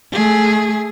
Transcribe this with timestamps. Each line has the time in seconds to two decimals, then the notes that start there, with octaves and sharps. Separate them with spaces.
0.13 A3 G#4